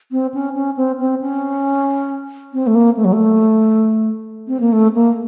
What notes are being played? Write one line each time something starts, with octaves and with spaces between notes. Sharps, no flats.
C4
C#4
C#4
C4
C4
C#4
C4
A3
A#3
A3
F#3
A3
C4
A#3
A3
A#3